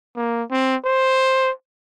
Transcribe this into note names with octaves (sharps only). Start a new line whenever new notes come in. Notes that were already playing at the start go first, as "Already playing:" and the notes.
A#3
C4
C5